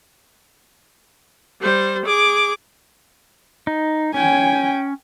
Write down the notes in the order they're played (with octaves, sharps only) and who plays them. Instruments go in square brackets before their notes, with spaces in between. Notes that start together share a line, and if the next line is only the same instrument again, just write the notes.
[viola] G3 C5
G#4 D6
[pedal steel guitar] D#4
[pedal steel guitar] C#4 [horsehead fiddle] G5 G#5